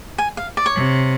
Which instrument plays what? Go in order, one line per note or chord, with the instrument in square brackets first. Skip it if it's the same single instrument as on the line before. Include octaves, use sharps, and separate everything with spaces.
[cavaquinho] G#5
F5
D5
C#5
[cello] C3